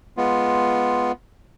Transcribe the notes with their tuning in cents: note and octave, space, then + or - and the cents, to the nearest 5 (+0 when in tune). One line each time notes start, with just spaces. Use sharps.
G#3 +10 B3 +0 F4 +0